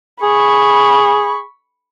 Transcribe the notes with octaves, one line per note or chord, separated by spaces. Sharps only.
G#4 B5 C#6